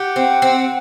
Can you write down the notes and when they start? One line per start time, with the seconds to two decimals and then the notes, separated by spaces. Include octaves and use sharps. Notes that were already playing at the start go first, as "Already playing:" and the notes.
Already playing: G4 F#5
0.16 C4
0.42 C4